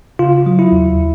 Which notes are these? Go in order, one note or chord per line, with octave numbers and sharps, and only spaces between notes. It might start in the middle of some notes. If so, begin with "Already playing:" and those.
C#3 F4
F#3
E4
D#2